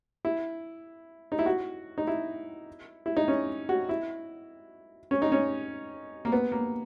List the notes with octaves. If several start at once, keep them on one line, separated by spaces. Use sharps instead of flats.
E4
D#4
E4
F#4
D#4
E4
E4
D#4
C#4
F#4
E4
C#4
D#4
C#4
A#3
B3
A#3